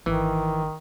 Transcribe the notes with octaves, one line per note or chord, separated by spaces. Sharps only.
G#1 D#3 E3